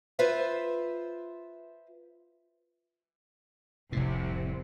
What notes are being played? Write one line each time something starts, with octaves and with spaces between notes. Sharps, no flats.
F4 B4 C5 E5
F1 C2 A2 C3